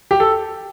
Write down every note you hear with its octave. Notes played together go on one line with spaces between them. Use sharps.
G4
A4